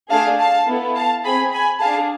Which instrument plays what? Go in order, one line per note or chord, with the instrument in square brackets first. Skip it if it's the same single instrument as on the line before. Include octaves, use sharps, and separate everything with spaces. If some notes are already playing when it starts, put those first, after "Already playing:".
[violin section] A3 D4 G#4 F5 A5
F5 A5
B3 E4 A4
F5 A5
C4 G#4 G#5 B5
G#5 B5
G#4 F5 A5
D4